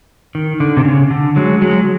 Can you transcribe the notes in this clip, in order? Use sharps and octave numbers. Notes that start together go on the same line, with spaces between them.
D#3
D3
C3
C#3
D3
F#3 G#3
F#3 G#3